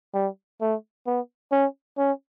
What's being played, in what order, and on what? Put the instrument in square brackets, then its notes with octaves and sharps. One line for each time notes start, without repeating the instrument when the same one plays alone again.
[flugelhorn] G3
A3
B3
C#4
C#4